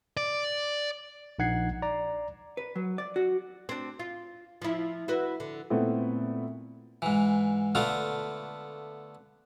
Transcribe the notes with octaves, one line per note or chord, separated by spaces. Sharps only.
D5
A#1 D#4 F#5 G#6 C7
D5 A#5
B4
F#3
D5
F#4
C4 D4
F4
F3 E4
E4 F#4 B4
D3
A#2 A3 B3 C4 E4
G#2 E3
D3 A3 B3 F4 F5 D6